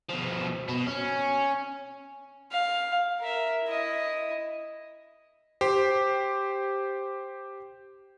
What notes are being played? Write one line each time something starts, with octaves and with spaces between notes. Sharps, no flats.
B2 F3
B2
C#4
F5
A#4 E5
E4 D#5
G4 C5